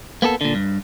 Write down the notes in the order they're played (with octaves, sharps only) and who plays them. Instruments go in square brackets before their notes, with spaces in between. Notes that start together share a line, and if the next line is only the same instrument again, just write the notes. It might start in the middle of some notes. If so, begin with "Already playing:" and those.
[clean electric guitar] A#3 B3 G4 A4
A#2 D3
G2